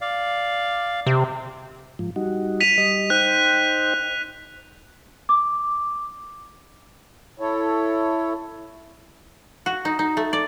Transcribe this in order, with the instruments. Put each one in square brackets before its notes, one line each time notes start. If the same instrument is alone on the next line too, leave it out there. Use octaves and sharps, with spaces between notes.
[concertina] D5 F5
[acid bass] C3
[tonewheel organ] G#2 F3
G3 D#4 F#4
[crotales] B6 D#7 F7
[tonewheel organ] G3 D#5
[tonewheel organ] D#4 C5 G5 [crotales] F#6
[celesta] D6
[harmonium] E4 A4 C#5
[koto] F#4
D#4
D#4
A3
D5